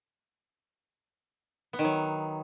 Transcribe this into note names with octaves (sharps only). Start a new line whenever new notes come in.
B3
D#3
F#3